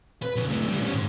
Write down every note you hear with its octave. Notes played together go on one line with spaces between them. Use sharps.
B4
C#3 F3
A2 D3
D3 G3
B3 C#4
G#2